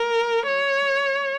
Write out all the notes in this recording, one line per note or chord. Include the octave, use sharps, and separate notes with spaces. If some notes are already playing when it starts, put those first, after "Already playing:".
Already playing: A#4
C#5